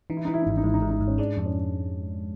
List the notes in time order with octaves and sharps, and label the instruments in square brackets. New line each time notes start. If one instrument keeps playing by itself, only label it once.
[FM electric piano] E3 [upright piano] D#4
[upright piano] E4
[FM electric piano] E3 [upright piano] D#4
[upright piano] E4
D#4
[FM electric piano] G#1 [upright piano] E4
[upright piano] D#4
[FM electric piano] G#2 [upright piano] E4
[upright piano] D#4
[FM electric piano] G#2 [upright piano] E4
[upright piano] D#4
[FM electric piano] G#2
[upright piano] C#4
[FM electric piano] G#3 [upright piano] D4
[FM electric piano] F2 [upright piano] D4
[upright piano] C#4